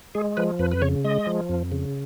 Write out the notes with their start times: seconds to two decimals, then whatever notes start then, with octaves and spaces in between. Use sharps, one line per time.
0.15 G#3 G#4
0.37 F3 B4
0.59 F2 B4
0.72 B4
0.82 C#3 C#5
1.05 G#3 D#5
1.27 F3
1.49 F2
1.72 C#3